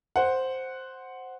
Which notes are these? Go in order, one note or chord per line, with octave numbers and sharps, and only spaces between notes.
C5 F#5